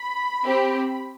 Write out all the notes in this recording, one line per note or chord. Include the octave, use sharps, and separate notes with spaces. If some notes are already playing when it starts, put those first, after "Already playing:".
Already playing: B5
C4 G4